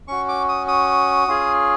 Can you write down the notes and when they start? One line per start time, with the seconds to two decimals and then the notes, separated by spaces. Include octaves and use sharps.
0.08 C#4 F#4 C#6
0.29 D6
0.49 D#6
0.68 D#6
1.28 C#4 F4 G#4